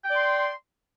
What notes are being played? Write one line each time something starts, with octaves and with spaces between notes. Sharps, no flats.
D5 G5 C6